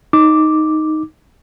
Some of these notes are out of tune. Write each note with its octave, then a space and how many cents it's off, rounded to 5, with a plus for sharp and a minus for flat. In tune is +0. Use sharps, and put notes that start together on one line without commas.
D#4 +0 D6 +0